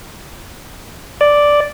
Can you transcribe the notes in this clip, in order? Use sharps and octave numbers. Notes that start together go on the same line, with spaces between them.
D5